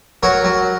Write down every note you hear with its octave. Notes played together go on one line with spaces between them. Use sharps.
F#3 A#4 C#5
F#3